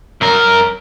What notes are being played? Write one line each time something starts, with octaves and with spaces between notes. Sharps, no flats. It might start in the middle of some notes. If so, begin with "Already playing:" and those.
F#2 A#4